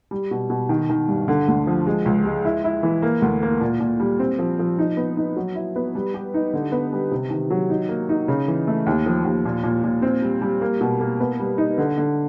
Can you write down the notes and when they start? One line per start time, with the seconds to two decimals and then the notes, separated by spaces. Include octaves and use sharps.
0.11 G3
0.31 B2
0.50 B2
0.69 D#3
0.90 D#3
1.08 G2
1.28 D3
1.48 D2
1.67 F3
1.86 G#3
2.06 C#2
2.25 G#3
2.45 E4
2.64 E4
2.83 E3
3.02 A#3
3.22 D2
3.43 A#3
3.61 A#2
3.80 A#2
4.00 G3
4.19 C4
4.39 F3
4.59 F3
4.79 D#4
4.97 B3
5.17 D#4
5.36 F#3
5.55 E4
5.76 B3
5.95 G3
6.14 G4
6.34 D#4
6.53 D3
6.72 B3
6.92 G3
7.11 C3
7.30 D#3
7.50 F#3
7.70 D#4
7.89 A#3
8.09 D#4
8.28 C#3
8.48 E3
8.67 A3
8.86 D#2
9.06 F3
9.25 D#2
9.45 A#2
9.63 A#2
9.84 A#2
10.02 C4
10.22 G3
10.41 G3
10.61 A#3
10.81 B2
11.00 A#3
11.20 B3
11.40 G3
11.58 D#4
11.78 D3
11.98 D3